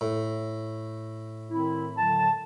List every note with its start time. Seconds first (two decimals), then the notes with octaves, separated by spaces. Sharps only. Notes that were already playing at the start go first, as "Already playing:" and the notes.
0.01 A2
1.50 D#3 C4 E4
1.97 D3 F#3 A5